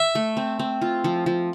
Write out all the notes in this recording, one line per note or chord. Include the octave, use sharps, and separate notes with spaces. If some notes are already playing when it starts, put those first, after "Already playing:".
Already playing: E5
A3
C4
C4
F4
F3
F3